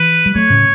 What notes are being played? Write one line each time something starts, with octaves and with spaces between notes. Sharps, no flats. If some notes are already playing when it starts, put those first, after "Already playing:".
Already playing: E3 B4
G3
F#3 A3 C#5
A2 C#3